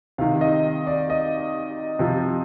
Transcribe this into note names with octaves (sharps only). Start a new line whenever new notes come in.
C3 D#3 F5
D#5
D5
D#5
C3 F3